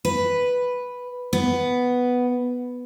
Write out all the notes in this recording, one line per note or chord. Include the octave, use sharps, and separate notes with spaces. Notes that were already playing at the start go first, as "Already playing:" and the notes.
B4
B3